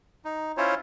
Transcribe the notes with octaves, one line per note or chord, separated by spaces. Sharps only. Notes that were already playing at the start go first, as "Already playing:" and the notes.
D#4
C#4 E4 F4 C5 C#5